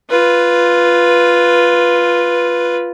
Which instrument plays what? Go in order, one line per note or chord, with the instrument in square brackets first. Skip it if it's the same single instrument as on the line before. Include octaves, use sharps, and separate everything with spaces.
[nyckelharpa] F4 B4